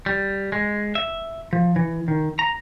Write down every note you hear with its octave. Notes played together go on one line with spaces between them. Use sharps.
G3
G#3
E5
F3
E3
D#3
A#5